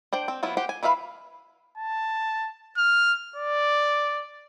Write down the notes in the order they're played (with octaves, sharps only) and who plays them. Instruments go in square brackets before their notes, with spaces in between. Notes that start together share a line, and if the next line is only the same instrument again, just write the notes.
[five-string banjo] D4 C5 G5
C4
F#3 B3 E4 F4
G4 C5 F#5 G5
G#5
E3 B4 E5 F5 B5
[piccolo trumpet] A5
F6
D5